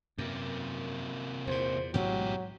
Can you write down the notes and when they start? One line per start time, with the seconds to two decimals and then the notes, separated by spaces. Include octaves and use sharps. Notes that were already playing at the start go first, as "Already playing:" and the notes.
0.18 F#2 C3 A#3
1.47 E2 A#2 C5
1.94 A1 G#2 B2 F#3 G#3 G4